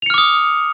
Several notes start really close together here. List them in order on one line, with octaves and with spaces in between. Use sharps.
F7 C#7 F6 D6 D#6